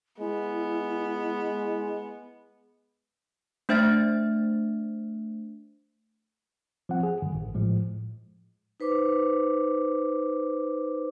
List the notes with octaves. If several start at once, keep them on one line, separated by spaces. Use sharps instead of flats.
G#3 B3 E4
A3 D4 C5 E5 F6 A6
F3 C4 F#5
G#4
G2 D3 D#3
A1
A2 F3 G#3
D#4 B4 C5 D6